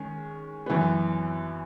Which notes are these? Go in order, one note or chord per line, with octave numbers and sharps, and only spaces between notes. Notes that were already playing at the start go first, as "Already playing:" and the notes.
Already playing: D#3 G#3 C#4
F#2 E3 B3